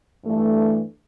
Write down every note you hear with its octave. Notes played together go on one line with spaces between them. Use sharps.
G2 E3 A3 D4